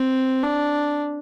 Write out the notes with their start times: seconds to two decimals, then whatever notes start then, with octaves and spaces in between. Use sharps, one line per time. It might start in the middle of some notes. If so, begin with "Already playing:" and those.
Already playing: C4
0.43 D4